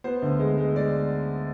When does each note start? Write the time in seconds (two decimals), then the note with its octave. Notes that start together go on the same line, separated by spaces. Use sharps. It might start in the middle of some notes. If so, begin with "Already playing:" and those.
0.04 B3 C5
0.22 D2
0.39 G#3
0.58 G#3
0.76 G#3 D5